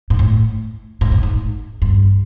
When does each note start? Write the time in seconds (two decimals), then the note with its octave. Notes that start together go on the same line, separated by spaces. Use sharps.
0.10 G#2
0.19 A2
1.01 G#2
1.12 A2
1.23 G#2
1.82 G2